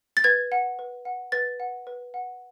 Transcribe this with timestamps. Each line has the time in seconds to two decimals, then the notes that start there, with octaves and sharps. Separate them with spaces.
0.17 A6
0.24 B4 G#6
0.52 F#5
0.79 B4
1.05 F#5
1.32 B4 A6
1.60 F#5
1.87 B4
2.14 F#5